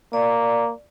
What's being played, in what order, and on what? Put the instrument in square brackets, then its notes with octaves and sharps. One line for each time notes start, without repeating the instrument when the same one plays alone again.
[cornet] A#3 [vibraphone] D5